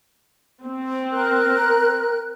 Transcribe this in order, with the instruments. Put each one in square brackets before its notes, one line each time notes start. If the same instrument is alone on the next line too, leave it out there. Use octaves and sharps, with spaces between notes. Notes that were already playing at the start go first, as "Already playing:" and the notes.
[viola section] C4
[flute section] A#4 F#6